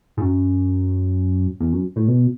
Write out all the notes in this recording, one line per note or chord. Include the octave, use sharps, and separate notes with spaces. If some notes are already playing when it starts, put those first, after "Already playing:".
G#2
F#2
E2
F#2
A2
B2